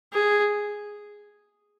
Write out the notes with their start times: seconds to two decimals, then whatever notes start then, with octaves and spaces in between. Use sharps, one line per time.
0.13 G#4